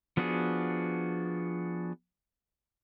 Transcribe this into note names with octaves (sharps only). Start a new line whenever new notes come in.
F3 B3 D4 F#4 G#4